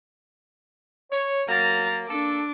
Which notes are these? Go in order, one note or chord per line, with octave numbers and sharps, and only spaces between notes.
C#5
F#3 A#3 A#5 A6
A#3 D4 A4 D6